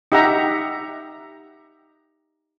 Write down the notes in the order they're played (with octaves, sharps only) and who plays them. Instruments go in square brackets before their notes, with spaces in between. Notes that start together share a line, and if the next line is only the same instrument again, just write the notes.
[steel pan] D#4 G4 E5 F#5 A#5